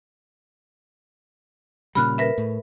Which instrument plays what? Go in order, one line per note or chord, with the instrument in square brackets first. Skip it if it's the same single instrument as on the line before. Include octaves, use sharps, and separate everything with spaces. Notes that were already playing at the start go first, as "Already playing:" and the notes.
[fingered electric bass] A#2 C#3 G3 [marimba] B5 F6 F#6
[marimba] A#4 B4 E5
[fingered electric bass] A2